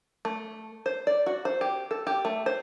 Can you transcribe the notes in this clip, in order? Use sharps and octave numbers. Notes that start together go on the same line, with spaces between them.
A3
C5
D5
F#4
C5
G4
A4
G4
A3
C5